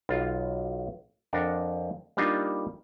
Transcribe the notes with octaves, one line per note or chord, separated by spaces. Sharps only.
B1 F4
F2 D4 A#4 F#5
G3 A#3 D4 D#4 F4